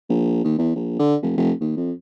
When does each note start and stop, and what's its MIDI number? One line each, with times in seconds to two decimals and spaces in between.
0.09 0.42 34
0.44 0.56 39
0.58 0.72 40
0.75 0.98 34
0.99 1.15 50
1.22 1.36 29
1.37 1.52 29
1.61 1.76 39
1.77 1.92 41